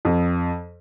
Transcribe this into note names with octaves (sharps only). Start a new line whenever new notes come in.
F2